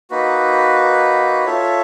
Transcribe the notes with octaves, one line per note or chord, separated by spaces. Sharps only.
A#3 D#4 F#4 B4
F4 A4 C#5 E5